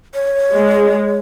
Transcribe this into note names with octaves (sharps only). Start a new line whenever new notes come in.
C#5
G#3